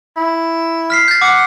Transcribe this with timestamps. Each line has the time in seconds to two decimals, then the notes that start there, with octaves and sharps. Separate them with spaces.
0.17 E4
0.90 F6 B6 C7
1.08 G6 A6
1.22 F#5 D6